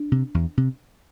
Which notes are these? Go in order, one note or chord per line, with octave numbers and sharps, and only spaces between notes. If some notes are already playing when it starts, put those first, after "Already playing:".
Already playing: D4
C3
E2
C3